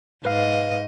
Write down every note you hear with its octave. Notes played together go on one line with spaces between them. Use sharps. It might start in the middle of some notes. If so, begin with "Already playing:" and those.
G#2 B4 D#5 F5